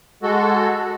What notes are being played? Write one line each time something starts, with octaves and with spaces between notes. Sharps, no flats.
G#3 F#4 A4